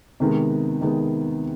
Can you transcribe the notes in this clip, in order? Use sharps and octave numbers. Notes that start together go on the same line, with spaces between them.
C3 D#3 G#3 B3
C3 D#3 G#3 B3